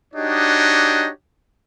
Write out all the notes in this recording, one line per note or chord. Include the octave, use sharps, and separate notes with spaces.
D4 D#4 F#4 G4 C#5 D#5